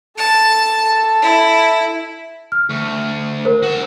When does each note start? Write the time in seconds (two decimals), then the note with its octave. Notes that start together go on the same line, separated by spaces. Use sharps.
0.18 A4 A5
1.22 E4
2.52 F6
2.70 D2
3.45 A#4 C5
3.63 F#4 E5